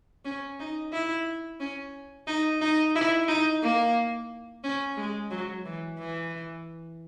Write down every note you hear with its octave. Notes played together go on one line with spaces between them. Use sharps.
C#4
D#4
E4
C#4
D#4
D#4
E4
D#4
A#3
C#4
G#3
F#3
E3
E3